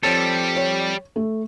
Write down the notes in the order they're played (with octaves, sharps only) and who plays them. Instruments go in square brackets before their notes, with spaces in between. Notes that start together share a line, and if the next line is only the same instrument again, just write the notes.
[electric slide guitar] F3 C4 A4 [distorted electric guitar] G3 [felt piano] C#5
[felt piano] C#5
A3